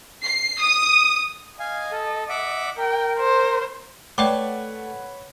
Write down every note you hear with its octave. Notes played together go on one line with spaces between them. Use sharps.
C7
D#6
D#5 F5 G#5
A4
E5 F#5 D6
A#4 G5
C5
A3 B4 C#5 D5 F#5 G5 D6